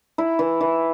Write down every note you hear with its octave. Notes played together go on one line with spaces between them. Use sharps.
E4
E3
E3